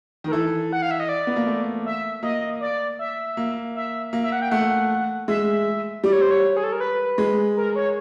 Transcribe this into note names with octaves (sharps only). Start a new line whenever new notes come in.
D#3
A#4
E3 A4
F#5
F5
E5
D#5
D5
B3
A#3
A3
E5
A#3 D#5
D5
E5
A#3
E5
A#3
E5
F#5
G5
A3 F#5
G#3 E5
G3 D5
C#5
C5
C#5
G#4
A4
A#4
B4
G#3
A#4
C#5